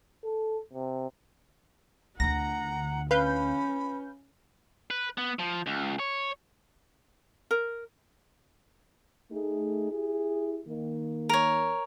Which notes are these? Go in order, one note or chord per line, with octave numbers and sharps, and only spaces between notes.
A4
C3
D2 D3 F#5 A#5 A#6
C#4 B4 F5 B5 G6
B4
B3
F3
C#2
C#5
A#4
A3 D#4 G#4
E4 G4 G#4
D#3 A#3
A#4 C#5